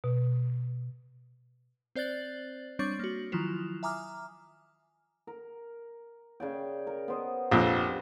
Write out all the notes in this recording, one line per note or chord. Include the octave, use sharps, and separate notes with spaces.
B2
C4 C5 D5 F#6 A6 F#7
G3 C4 D4 C#5 C#6 A6
A#3 F#4
D#3 F3 F#3 E4 F4
E5 G#5 A#5 D6 D#6 F6
A#4
C#3 D5 G5
A#4
B3 C5 D#5
A#1 F2 G4